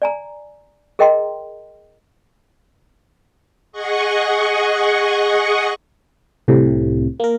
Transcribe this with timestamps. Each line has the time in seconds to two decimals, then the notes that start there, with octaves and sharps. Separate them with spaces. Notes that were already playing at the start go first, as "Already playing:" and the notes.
0.02 D5 G#5 A#5
0.99 G#4 A#4 D#5 G5 A#5 C6
3.72 G#4 D#5 F#5 C#6
6.48 C2 A2 C3
7.20 A#3 A#4